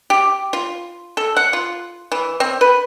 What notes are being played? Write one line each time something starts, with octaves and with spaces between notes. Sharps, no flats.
G4
F4
A4
F#5
F4
E3
C4
B4